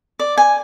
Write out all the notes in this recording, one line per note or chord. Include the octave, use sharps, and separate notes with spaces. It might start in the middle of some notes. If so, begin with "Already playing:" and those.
D5
G#5